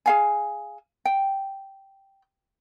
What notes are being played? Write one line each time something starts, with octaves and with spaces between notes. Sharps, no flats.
G#4 F5 G#5
G5